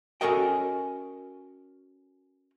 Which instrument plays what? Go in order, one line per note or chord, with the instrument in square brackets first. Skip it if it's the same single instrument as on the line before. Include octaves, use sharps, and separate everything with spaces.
[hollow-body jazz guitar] C#4 F#4 A4 A#4 D#5 G5